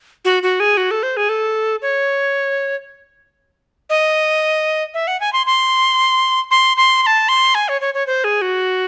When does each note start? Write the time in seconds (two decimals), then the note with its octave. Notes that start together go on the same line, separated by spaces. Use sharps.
0.25 F#4
0.43 F#4
0.60 G#4
0.77 F#4
0.91 A4
1.03 C5
1.17 G#4
1.29 A4
1.82 C#5
3.90 D#5
4.94 E5
5.07 F#5
5.20 G#5
5.33 C6
5.46 C6
6.51 C6
6.77 C6
7.03 C6
7.06 A5
7.29 C6
7.55 G#5
7.69 C#5
7.81 C#5
7.94 C#5
8.07 C5
8.24 G#4
8.42 F#4